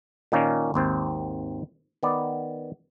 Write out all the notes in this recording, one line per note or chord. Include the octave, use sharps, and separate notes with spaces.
A#2 D#3 A#3 C#4
G#1 D#2 C4 C5
D#3 B3 D5